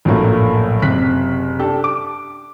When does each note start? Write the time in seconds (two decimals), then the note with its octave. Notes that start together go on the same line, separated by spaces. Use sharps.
0.05 A#1 F#2 A2 F#3 A3 A#3
0.82 F#1 C3 F#6 B6
1.59 D4 G4 A4
1.84 D6